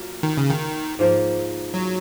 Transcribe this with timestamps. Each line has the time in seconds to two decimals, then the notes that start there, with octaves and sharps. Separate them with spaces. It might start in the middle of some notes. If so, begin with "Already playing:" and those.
Already playing: F#3 A#3 F4
0.23 D#3
0.37 C#3
0.51 D#3
0.99 G#2 F3 A#3
1.74 F#3